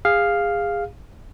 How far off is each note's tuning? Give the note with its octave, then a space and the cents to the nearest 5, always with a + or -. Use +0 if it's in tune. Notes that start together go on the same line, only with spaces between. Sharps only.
G#4 -25 F5 +0